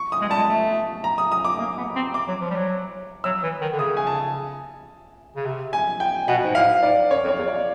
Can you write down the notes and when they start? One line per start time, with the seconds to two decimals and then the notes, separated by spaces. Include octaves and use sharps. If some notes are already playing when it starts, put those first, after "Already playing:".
Already playing: C#6
0.12 D#6
0.21 G#3
0.29 G3 A5
0.36 G#3
0.49 A3
1.04 A#5
1.18 D#6
1.32 D#6
1.45 D6
1.54 A3
1.59 A#3
1.77 B3
1.96 C4
2.14 D6
2.28 F#3
2.41 F3
2.50 G3
2.56 F#3
3.24 F#3 E6
3.43 E3
3.61 D#3
3.72 D3
3.79 C#3 D#6
3.97 G#5
4.07 A5
5.36 C#3
5.45 C3
5.73 G#5
6.00 G5
6.28 B2 F#5
6.44 G#2
6.55 A2 F5
6.83 G#2 D5
7.10 F#2 C#5
7.24 F2
7.28 C#5
7.38 E2
7.48 D5